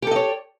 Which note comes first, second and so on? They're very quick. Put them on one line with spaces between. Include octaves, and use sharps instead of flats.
G4 A4 D#5 C#5